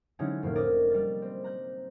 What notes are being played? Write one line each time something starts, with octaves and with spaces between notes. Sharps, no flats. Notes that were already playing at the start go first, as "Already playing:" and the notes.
D3 F#3 G#3 C#4 D#4 E4
F1 A2 A#3
A#4 D5 D#5
G3 F#6 A6
C4
A#5 F#6 G6